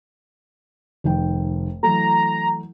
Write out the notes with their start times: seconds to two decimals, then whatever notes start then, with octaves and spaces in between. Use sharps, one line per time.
1.04 F1 D#3 G5
1.83 E3 F#3 A3 A#5